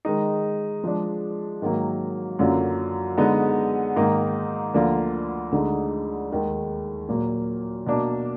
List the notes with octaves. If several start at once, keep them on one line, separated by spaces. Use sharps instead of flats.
D#3 G#3 D#4
F3 G#3 D4
G#2 D#3 F#3 A#3
F#2 D3 F#3 A#3 F4
D3 G#3 B3 D#4
G#2 D#3 A#3 D#4
D2 D3 F3 A#3 F4
D2 D3 G#3 D#4 G#4
D#2 D#3 G#3
A#2 F#3 A#3
B2 A#3 D4